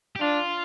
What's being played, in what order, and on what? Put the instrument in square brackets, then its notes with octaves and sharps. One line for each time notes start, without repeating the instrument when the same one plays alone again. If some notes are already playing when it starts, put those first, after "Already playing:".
[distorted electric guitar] G4
[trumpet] D4 [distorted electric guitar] F4